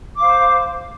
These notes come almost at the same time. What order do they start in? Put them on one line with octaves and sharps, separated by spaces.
D6 F5 C5